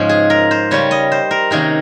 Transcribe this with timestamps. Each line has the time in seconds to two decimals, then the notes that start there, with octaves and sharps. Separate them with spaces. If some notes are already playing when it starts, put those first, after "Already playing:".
Already playing: G#2 C#3 F3 G#3 C#4
0.09 G#4
0.30 A#4
0.51 C5
0.71 C#3 G3 C#4 C#5
0.91 D#5
1.12 C5
1.31 A#4
1.51 C3 D#3 A#3 C#4 G#4